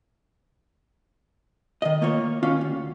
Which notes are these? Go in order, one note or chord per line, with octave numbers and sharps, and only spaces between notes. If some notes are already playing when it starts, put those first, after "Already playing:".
D#3 D#5
A3 A#3 F4 C#5
D#3 C#4 F4 F#4 F5
D2